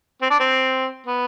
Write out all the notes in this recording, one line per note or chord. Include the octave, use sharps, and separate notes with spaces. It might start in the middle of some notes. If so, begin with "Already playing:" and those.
C4
D4
C4
B3